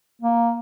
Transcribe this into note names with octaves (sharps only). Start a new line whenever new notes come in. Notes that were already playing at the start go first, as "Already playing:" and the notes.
A#3